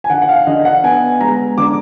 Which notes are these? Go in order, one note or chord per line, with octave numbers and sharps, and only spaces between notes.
G#5
D3 F#5
F#5
F5
D3 D#5
F#5
B3 G#5
G#3 A#5
D3 D6